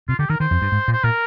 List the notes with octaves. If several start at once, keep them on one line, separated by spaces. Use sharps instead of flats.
C3 F4
D3 G4
D#3 A#4
D#3 C5
F2
G2
G#2
A#2
C5
A#2 A#4